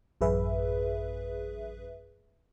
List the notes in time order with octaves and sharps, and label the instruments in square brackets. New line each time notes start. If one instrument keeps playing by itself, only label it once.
[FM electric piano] A1 F#2 G#4 B4 E5